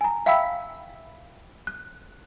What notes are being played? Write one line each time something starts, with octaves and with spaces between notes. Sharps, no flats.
G#5 A#5
E5 F5 G5 B5 E6 B6
F#6